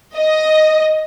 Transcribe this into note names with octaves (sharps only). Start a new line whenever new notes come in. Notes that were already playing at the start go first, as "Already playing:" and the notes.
D#5